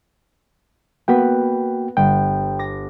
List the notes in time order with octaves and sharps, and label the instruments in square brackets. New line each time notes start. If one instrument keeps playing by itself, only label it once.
[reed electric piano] A#3 F#4 G5 [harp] B3 B4
[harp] G1 [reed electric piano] G5
[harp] D6 A#6